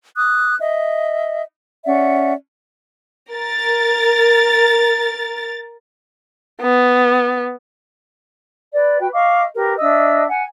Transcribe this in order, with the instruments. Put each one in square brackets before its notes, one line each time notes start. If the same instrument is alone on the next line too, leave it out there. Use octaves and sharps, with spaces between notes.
[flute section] D6 D#6 F#6
D#5 E5
C#4 D5 E5 F#5
[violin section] A#4 A6
[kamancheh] B3
[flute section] B4 D5
F#4 B4 G5
D#5 F5 C#6 D6
G4 A#4 B4
D4 D#5 E5 E6
F#5 G#5